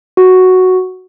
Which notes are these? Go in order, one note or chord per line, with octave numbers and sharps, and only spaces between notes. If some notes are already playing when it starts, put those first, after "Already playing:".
F#4